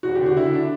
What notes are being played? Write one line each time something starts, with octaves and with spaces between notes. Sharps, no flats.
E1 F#4
D3 G4
F#4
D3 E4
D4